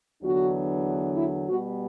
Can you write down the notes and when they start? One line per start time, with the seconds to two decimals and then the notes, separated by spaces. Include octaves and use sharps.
0.22 E2 D3 F#3 B3 D4 F#4
1.16 E4
1.47 B2 G3 B3 F#4